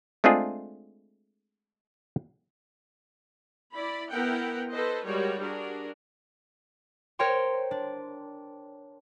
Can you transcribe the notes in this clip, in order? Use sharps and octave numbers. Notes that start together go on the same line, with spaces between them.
G#3 A3 C4 D4 F4 G#4
E4 D5 B5
B3 E4 A#4 F#5 G5
A4 B4 C5 D#5
G3 G#3 F#4 A#4 C#5
D4 F#4 G#4 A#4
A#4 C5 C#5 G5 C6
D4